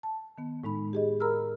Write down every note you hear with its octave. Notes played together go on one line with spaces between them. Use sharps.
A5
D#3 B3
A2 G#3 D#4 B5
G4 G#4 D#5
A#4 A#5 B5 E6 F6